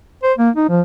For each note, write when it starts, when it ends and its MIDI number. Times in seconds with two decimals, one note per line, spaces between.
0.23 0.33 72
0.38 0.50 58
0.56 0.68 63
0.69 0.81 53